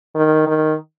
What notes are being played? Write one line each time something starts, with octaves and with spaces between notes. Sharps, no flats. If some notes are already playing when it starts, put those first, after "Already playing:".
D#3
D#3